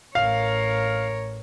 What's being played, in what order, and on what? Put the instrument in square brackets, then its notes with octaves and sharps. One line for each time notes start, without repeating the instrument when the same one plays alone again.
[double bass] A1 [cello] A#4 C#5 [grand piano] F5